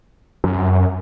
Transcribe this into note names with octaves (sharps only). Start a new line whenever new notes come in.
F#2